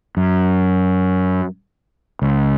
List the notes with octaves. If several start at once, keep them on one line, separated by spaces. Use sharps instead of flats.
F#2
C#2